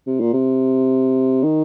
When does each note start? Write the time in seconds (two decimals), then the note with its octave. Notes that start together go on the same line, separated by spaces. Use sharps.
0.07 C3
0.20 A#2
0.33 C3
1.43 D#3